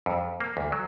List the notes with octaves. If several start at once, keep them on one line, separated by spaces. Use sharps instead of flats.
F2
A#3
D2
F#3